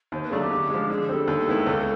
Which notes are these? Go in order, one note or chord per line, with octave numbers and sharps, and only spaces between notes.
D#2 C5
B4
C#3 F#3 A3 D4 G#4
G4
D3
F3 G#3
D3 G#4
G3 C4 A4
D#2
D#3 G#3 B3 E4
C#2